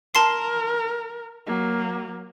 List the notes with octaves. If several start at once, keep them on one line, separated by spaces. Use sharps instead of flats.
A#4 A5 C6 C7
F#3 A#3